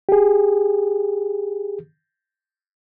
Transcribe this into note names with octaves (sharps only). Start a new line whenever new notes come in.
G4 G#4